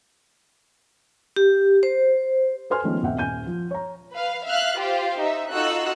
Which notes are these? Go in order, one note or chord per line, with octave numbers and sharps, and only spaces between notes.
G4
C5
A4 B4 C5 G#5 C6 F6
D#3 F3 G#3 A3 B3 C#4
D#1 B1 C4 E5 F#5 G5
D#1 G#5 G6 D#7
F3
C#5 A#5
B4 F5
E5 F5 F6 F#6
F4 G4 C5 F5
D#4 E5
D#4 F4 F#4 A4 E6 F#6